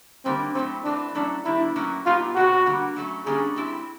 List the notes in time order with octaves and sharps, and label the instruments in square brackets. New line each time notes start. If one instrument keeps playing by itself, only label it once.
[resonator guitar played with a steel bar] D3 G3 A#3 D#4 [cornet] C4
[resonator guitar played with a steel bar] A2 F#3 A3 [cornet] C4
[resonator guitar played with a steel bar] E3 A3 C4 [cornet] D4
[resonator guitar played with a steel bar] F#3 A3 C#4 E4 [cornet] D4
[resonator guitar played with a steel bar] D#3 G3 B3 D4 [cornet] E4
[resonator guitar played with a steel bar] A2 F#3 A#3 C#4 F#4
[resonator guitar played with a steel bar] A#2 G3 B3 D#4 G4 [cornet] F4
[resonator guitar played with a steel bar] B2 G#3 C4 [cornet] F#4
[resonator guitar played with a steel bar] D3 G3 A#3
F#3 A3 C#4
[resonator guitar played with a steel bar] D3 G3 A#3 C#4 [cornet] G#4
[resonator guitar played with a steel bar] G3 C4 E4